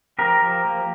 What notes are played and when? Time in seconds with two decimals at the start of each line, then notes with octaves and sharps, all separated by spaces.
0.19 F3 G4 A#4
0.42 F3
0.65 A#3